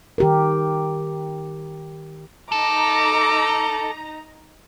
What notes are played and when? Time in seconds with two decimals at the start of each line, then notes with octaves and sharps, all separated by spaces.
0.18 D#3 G4 A#4
2.52 D#4 A4 A#5 D6